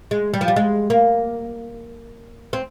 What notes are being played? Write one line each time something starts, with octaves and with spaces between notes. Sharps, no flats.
G#3
G3
F3
G3
G#3
A#3
C4